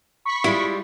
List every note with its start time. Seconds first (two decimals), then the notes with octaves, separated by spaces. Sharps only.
0.25 B5 C#6 B6
0.44 G3 G#3 E4 F4